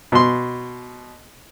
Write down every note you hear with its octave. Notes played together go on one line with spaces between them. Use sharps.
B2 C6